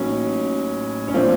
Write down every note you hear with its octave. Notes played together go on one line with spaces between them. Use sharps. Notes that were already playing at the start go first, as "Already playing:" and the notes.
Already playing: A1 A2 F#3 A#3 C#4 D#4
C#4
A#2 F3 A3 C4 D4 F4